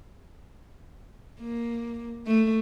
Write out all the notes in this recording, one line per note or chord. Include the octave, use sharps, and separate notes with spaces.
A#3
A3